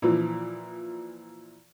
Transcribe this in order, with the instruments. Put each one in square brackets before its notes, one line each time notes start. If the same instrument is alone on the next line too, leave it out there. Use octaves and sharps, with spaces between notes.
[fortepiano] A#2 E3 F3